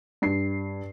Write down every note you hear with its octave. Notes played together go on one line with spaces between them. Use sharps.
G2 C7